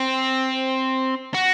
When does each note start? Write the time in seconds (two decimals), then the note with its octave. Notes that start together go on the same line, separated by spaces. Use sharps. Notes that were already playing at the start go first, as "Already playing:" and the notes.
Already playing: C4
1.35 F#4